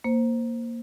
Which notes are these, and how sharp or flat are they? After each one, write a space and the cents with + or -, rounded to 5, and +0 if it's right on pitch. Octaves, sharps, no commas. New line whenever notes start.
A#3 +0 C5 +0